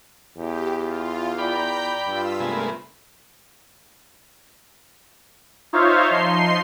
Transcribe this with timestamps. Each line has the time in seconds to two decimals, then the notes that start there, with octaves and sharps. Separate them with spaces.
0.36 E2 G4
0.79 F4
1.39 D5 G5 A#5 B5 G6
2.07 G2 F4 E6 B6
2.40 C3 G#3 A3 B3 A#4
5.73 D#4 F4 C5 C#5 E5 F5
6.10 F3 D#4 C6 C7